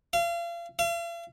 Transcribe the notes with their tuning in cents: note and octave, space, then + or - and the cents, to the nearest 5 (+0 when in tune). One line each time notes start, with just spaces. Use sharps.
F5 -35
F5 -45